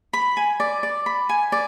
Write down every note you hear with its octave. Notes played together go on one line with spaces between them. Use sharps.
B5
G#5
D5
D5
B5
G#5
D5